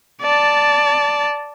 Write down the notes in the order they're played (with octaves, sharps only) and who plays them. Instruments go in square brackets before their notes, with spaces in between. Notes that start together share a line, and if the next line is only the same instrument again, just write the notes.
[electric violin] D5 A5